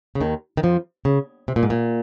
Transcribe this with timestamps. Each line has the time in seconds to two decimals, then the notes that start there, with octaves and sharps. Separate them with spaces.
0.15 C#3
0.21 D#2 D#3
0.57 D#3
0.63 F2 F3
1.05 C#3
1.48 C3
1.56 A#2
1.63 G#2
1.70 A#2